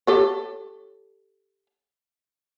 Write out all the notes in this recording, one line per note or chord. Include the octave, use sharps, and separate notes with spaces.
G4 A4 C#5